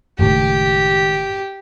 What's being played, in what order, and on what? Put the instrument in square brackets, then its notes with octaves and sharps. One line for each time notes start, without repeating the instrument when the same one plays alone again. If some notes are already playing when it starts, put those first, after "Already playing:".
[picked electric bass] F#1 A2 [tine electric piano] D#3 G#3 [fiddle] G4